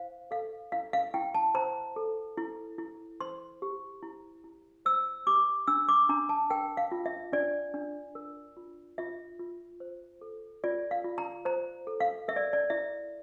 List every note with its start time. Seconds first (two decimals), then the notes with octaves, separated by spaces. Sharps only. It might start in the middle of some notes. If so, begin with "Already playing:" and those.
Already playing: E4 C5 F5
0.31 A4 F5
0.72 E4 F5
0.93 F5
1.14 E4 G5
1.34 A5
1.55 C5 A#5
1.96 A4
2.37 E4
2.78 E4
3.21 C5 C6
3.62 G4
4.03 E4
4.44 E4
4.85 C5 E6
5.27 G4 D6
5.67 D4 E6
5.89 D6
6.09 D4 A#5
6.29 A5
6.50 A#4 G5
6.77 F5
6.92 F4
7.06 E5
7.33 D4 D5
7.74 D4
8.15 A#4
8.57 F4
8.98 F4 E5
9.40 F4
9.80 C5
10.21 A4
10.64 F4 D5
10.91 F5
11.04 F4
11.18 A#5
11.45 C5 A#5
11.87 A4
12.00 F5
12.28 A#4 E5
12.36 D5
12.53 D5
12.70 E4 E5